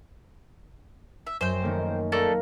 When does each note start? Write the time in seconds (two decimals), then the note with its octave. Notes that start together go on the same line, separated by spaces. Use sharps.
1.27 E5
1.41 F#2 C5 G5
1.62 D#3 A3 A#3
2.12 A3 A4 A#4 D5 F5